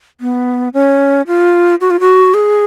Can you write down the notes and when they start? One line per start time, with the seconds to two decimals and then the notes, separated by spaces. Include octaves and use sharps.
0.21 B3
0.74 C#4
1.27 F4
1.81 F#4
1.90 F4
2.00 F#4
2.34 G#4